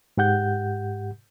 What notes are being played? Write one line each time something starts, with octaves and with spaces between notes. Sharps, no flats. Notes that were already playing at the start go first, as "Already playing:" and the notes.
G#2 G4 F#5 G6